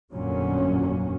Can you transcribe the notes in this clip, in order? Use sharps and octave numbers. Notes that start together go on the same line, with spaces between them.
G1 F2 A#2 D3 F#3 C#4